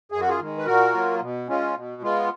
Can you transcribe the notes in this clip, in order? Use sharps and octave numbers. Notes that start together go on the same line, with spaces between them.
F#2 G#4
F#4
F4 G#4
D#3 G#3
B4
A#2 F#4 A#4
F#3 A#3 F4
B2
G#3 C#4 F4
B2
G#3 B3 F4